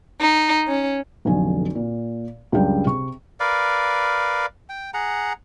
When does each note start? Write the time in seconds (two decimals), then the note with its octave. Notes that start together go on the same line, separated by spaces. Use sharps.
0.21 D#4
0.68 C#4
1.25 F1 B1 D3 G#5
1.75 A#2
2.52 C#2 F#2 G3 D4 G5
2.85 C3 C#6
3.40 A#4 B4 D5 F5
4.69 G5
4.94 G#4 F#5 A#5